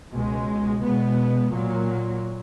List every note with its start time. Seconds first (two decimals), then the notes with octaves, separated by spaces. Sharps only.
0.14 C#2 B2 G#3
0.83 B2 G#3 B3
1.51 A#2 F#3 A#3